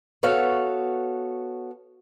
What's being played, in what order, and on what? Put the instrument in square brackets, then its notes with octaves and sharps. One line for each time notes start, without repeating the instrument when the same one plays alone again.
[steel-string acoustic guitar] B3 F#4 A4 C#5 F5